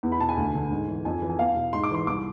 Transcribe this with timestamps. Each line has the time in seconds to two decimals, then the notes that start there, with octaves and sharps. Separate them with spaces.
0.03 E2
0.12 B5
0.20 B2 A5
0.29 G#5
0.37 D2
0.55 D3
0.71 G#2
0.88 E3
1.05 F2 G#5
1.22 E3
1.30 G#5
1.39 E2 F5
1.56 B2
1.73 G#2 C6
1.83 D6
1.91 E3 C6
2.07 C2 D6